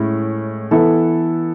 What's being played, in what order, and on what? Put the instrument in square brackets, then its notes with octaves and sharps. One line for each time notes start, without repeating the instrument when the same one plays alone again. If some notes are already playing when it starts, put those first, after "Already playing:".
Already playing: [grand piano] A2 G#3 C#4 E4
E3 B3 E4 A4